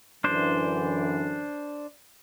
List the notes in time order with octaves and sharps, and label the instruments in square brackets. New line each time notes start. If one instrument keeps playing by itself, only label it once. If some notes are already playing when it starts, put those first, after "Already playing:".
[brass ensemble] F#2 D3 E3 [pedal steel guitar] D4 C5